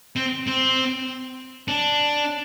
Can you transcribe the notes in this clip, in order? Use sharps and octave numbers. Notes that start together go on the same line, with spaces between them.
C4
C4
D4